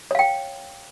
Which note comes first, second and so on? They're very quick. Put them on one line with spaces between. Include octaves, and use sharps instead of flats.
C#5 F5 G5